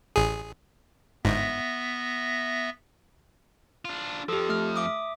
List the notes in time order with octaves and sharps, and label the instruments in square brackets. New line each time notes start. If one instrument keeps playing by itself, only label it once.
[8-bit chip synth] A1 G#4
[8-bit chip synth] G1 G#2 [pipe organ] B3 E5 A#6
[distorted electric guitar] D4 F4
[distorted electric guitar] F2 F3 [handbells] G4 A4
[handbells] A3 F6
E5 D6 D#6